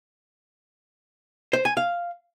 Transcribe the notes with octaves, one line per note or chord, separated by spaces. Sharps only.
C5
G#5
F5